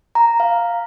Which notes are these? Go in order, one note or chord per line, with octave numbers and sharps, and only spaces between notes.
A#5
F5